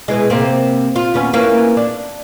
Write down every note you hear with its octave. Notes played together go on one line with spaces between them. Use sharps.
B2 E3 G#3
C3 A#3 C4
F4
D#2 B3 C#4
E3 A#3 C#4
D4